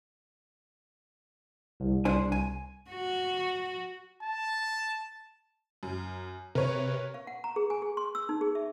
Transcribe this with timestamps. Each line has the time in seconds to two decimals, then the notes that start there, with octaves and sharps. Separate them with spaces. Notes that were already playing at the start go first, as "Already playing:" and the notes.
1.80 C2
2.05 D4 C5 G#5
2.32 G#5
2.91 F#4
4.22 A5
5.83 F#2
6.55 C3 A#4 B4 C#5
7.14 F5
7.27 F#5
7.44 A#5
7.56 G#4
7.70 G#5
7.82 G#4
7.97 C6
8.15 E6
8.29 D#4
8.41 G#4
8.55 E5